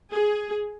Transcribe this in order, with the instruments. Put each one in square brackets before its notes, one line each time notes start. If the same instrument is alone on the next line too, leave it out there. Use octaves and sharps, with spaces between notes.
[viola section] G#4